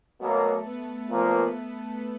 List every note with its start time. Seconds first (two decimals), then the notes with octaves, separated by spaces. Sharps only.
0.21 B2 F#3 A3 A#3 A4
0.65 B3 B4
1.09 A#2 F3 A#3